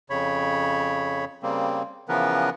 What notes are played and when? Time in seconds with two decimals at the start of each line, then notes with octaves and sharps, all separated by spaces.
0.10 F2 C#3 C#5 B5
1.43 C#3 G3 A#3 C4
2.09 C#3 E3 F3 B3 A#4 B4